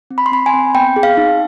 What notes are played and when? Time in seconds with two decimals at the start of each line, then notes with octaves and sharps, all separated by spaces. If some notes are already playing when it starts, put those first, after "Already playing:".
0.10 C4
0.18 B5
0.26 C6
0.31 C4 B5
0.46 G#5
0.53 C4
0.74 B3 G5
0.96 G#4
1.03 F5
1.17 D#4